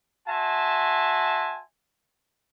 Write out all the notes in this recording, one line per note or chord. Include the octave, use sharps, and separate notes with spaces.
F#4 E5 G#5 A5 C6